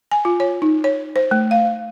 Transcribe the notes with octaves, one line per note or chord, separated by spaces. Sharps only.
G#5
F4
C#5
D#4
C#5
C5
A3
F5